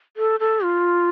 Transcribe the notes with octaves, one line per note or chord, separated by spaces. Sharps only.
A4
A4
F4